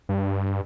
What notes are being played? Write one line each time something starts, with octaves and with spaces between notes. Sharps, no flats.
G2